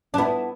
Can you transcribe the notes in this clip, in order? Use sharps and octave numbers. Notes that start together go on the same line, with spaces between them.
D4
B3 E4